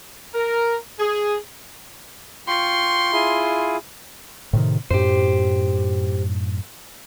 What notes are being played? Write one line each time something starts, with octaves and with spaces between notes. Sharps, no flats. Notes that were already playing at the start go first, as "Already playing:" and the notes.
A#4
G#4
F4 G5 C6 C#6
E4 F4 G#4
A2 C3 D#3
F#2 A2 G4 C5